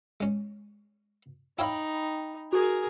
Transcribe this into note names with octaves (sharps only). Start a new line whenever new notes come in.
G#3 C#4
D#4 E4 C#5 F5 G5 B5
F#4 G#4 A#4